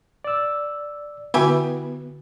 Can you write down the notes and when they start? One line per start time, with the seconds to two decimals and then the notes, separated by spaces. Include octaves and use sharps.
0.24 D5 E6
1.34 D3 B3 E4 F#4 G4 G#5 B5